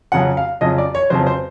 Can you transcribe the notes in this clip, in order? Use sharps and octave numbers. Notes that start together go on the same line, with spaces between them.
F2 C#3 F#3 F#5
F5
F2 C#3 F#3 D#5
D5
C#5
F2 C#3 F#3 C5
C5